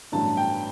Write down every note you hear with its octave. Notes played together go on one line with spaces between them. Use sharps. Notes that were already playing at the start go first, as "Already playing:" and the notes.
A1 G2 F#3 B3 A5
G5